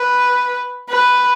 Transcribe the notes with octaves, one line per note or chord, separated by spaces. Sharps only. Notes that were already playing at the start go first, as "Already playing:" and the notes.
Already playing: B4
B4